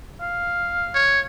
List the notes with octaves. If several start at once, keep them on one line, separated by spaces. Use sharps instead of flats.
F5
C#5